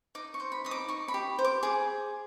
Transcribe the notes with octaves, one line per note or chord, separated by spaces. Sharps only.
D#4 D6
C#6
C5
B5
D#4 D#6
D6
D#4 C#6
B5
G4
C5
D6
G#4 D6